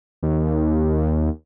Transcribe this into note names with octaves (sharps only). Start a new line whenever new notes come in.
D#2